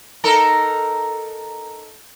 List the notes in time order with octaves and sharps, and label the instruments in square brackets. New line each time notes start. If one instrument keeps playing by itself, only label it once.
[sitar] D#4 A4 A#4